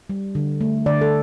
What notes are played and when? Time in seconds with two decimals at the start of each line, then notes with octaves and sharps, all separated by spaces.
0.09 G3
0.35 D3
0.61 A3
0.86 D3 D5
1.01 A4